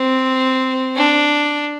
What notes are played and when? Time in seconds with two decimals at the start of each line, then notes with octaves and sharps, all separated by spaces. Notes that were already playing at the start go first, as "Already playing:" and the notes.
Already playing: C4
0.96 D4